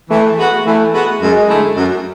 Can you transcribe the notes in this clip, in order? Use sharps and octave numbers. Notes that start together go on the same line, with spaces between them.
E3 A3
G#3 B3 F#4
E3 A3
G#3 B3 F#4
F#2 G#3
D3 A3 E4
F#2